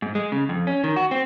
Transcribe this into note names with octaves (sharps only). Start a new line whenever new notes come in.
G#2
G#3
C#3
F2
C#4
D#3
F#4
C4